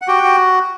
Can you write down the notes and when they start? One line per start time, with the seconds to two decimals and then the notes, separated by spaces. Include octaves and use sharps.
0.02 F#5
0.08 F#4 G4 G5
0.23 F#4